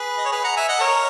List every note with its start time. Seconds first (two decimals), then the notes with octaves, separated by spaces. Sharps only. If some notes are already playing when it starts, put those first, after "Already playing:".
Already playing: G#4 B4
0.18 D#5
0.25 C#5
0.32 G#4 B4
0.44 F#5 A#5
0.57 E5 G#5
0.69 D#5 F#5
0.80 A#4 C#5